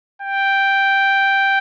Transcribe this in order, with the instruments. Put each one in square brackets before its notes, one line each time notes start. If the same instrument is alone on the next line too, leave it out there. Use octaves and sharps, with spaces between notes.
[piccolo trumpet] G5